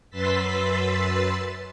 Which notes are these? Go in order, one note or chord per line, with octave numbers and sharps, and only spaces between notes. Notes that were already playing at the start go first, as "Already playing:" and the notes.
F#2 B4 C6 E6 A6 B6